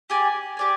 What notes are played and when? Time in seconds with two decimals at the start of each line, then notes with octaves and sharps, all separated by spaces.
0.10 G4 D5 G#5
0.57 G4 D5 G#5